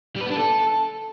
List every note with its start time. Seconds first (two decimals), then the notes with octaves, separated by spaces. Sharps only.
0.16 G3
0.21 B4
0.26 B3
0.31 D4
0.36 A4